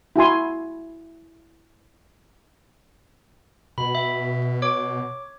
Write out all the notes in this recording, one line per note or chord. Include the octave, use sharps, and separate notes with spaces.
E4 F#4 G#5 C6
B2 B5
B2 E5
C#5 D6